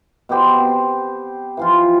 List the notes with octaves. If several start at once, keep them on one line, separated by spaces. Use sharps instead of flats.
B2 B3 G4 C5
C4
E3 F3 F4